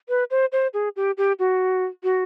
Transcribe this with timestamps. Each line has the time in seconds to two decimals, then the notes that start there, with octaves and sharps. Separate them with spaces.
0.09 B4
0.31 C5
0.52 C5
0.74 G#4
0.96 G4
1.18 G4
1.39 F#4
2.03 F#4